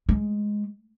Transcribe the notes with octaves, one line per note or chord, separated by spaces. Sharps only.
G#3